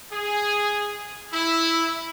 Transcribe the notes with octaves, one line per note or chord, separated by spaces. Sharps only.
G#4
E4